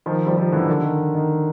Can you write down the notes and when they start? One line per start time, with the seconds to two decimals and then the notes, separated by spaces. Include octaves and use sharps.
0.06 D#3 F3
0.27 F3 G3
0.37 D#3 F3
0.52 D3 E3
0.61 D#3
0.69 D3
0.83 D#3
1.15 D#3